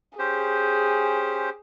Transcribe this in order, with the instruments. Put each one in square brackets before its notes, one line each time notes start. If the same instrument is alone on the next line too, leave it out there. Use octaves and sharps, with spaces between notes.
[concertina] C#4 G4 C5 [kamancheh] G#4